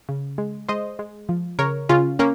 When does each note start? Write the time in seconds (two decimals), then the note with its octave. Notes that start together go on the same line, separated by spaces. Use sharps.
0.09 C#3
0.38 G#3
0.69 G#3 C5 D#5
0.99 G#3
1.29 F3
1.59 C#3 A#4 C#5
1.89 C#3 C#4 F4
2.19 A#3 C#4